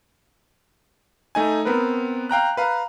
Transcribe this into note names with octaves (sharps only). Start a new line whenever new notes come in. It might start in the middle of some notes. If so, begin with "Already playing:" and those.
A3 D#4 G#5
B3 C4 A#4 B4
F5 G5 A#5 F#6
B4 F5 A#5